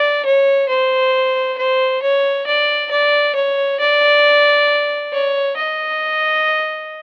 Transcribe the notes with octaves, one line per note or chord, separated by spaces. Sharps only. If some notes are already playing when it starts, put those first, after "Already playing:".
Already playing: D5
C#5
C5
C5
C#5
D5
D5
C#5
D5
C#5
D#5